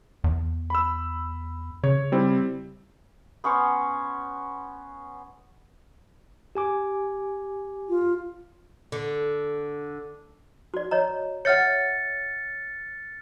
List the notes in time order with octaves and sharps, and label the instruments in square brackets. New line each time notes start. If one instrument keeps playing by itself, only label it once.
[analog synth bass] E2
[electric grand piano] B5 E6
[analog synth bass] C#3 [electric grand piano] C#5
[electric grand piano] G3 C4 E4
[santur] B3 C#4 C5 C#6
[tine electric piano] G4 G#5 D6
[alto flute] F4
[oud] D3
[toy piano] F#4 D5
C#5 D#5 A#5
[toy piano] C#5 E5 F#5 [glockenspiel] F6 A6 C#7